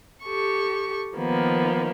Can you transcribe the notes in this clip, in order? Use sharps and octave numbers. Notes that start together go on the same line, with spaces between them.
G4 A4 C#6
D#3 F3 A#3 B3